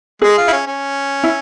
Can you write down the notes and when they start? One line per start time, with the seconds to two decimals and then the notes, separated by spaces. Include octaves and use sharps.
0.22 G#3 G#4
0.37 F4
0.47 E4
0.53 C#4
0.67 C#4
1.23 E4